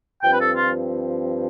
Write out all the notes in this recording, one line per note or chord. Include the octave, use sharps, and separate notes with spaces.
G2 F3 C4 G5
B4
A4
F4